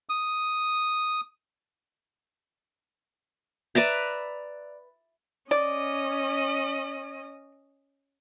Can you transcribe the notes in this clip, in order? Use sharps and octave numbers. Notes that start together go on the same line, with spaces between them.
D#6
B4 D5 E5 A#5
C#4 D5 D#5